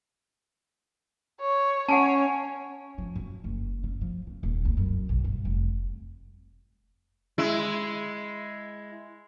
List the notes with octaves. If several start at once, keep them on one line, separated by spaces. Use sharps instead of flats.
C#5
C#4 C#5 F#5 G#5 A5
F3
F#2
F#1
C#3
F3
C#3
D#1
D2
F#2
B1
G2
F1
G#3 E4